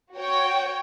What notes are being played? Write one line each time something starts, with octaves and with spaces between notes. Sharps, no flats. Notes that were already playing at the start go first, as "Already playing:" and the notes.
F#4 C#5 G5